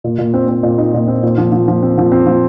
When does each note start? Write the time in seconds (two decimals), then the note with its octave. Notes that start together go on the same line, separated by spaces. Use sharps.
0.04 A#2
0.18 A#2
0.34 C4
0.48 C4
0.63 A#2
0.78 D#4
0.94 A#2
1.08 C4
1.23 A#2
1.38 F3
1.52 F3
1.68 F3
1.83 C4
1.98 F3
2.12 C4
2.27 F3